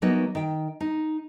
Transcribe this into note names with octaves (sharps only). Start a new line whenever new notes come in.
E3 F#3 A#3 B3 D#4
D#3 G5
D#4